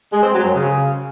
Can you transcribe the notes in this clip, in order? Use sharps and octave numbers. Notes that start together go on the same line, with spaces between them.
G#3
C4
F#3
F#2
C#3